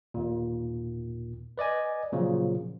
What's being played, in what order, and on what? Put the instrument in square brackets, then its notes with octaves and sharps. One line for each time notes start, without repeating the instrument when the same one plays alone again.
[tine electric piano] D#2 A#2
B4 D5 D#5 G#5
A#2 C#3 F3 F#3